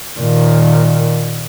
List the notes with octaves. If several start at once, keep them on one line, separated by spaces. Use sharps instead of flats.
A#2 D#3